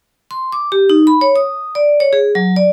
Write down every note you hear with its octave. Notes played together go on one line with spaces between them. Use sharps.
C6
D6
G4
D#4
B5
C#5
D#6
D5
C#5
G#4
F#3
D5